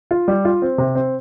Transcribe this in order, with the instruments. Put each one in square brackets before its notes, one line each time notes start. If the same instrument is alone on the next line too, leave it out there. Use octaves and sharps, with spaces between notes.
[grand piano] F4
G3
F4
C4
C3
C4